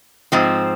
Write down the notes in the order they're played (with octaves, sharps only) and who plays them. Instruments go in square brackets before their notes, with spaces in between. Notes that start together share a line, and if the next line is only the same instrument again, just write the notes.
[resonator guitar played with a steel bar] G#2 F3 C4